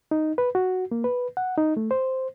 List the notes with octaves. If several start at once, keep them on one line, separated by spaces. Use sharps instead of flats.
D#4
B4
F#4
A#3
B4
F#5
D#4
A3
C5